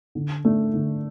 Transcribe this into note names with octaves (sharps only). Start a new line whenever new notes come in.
D3
A3 D4
D3